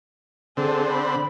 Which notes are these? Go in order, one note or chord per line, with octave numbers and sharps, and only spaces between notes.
D3 C4 G#4 A4
B5